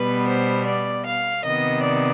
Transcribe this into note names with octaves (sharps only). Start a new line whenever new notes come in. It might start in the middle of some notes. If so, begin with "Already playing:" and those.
Already playing: B2 G3 B3 B4
C5
D5
F5
C3 D#3 B3 D#5
D5